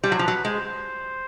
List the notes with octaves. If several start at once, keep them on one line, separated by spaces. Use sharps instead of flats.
G3 C5
F#3
F3
F#3 B4
G#3 C5
C5